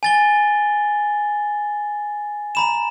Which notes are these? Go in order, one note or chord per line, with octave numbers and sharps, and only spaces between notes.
G#5 A6 G7
A#5 B5 E7